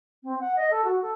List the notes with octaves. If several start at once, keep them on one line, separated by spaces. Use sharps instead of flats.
C4
F#5
D#5
A4
F#4
A4